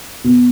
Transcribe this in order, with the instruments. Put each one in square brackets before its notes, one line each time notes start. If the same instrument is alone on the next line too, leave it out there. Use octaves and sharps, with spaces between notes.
[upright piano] B2